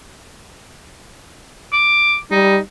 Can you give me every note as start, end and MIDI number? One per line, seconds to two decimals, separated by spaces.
1.73 2.17 86
2.31 2.58 55
2.31 2.58 63